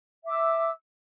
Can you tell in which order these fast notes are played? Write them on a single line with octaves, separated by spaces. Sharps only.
E5 D6 E6